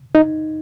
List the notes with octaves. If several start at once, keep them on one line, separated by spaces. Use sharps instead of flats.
D#4